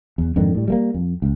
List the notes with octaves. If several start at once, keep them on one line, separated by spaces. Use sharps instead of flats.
E2
F2 G#2 D3 D#3
A2 G3
G3 A3 A#3
F2
C#2